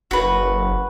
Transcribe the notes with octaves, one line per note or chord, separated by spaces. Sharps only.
F#1 F#4 B4